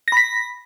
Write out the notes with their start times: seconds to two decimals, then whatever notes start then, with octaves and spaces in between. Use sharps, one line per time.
0.08 A#6
0.12 B5
0.17 B6